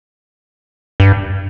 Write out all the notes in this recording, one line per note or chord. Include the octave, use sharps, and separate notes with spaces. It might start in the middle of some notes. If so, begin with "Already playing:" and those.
G2